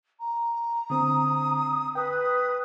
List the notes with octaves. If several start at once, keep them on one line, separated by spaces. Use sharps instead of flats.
A#5
D3 C4 D#6
B4 G5 D#6